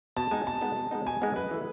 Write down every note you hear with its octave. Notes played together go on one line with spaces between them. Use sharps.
B2 A5
G#3 B3 D#4 G#5
B2 A5
G#3 B3 D#4
B2
G#3 B3 D#4
B2 G#5
G#3 B3 D#4
F#2 B4
E3 A3